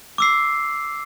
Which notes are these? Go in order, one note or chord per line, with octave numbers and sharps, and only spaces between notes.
D6 E6 C7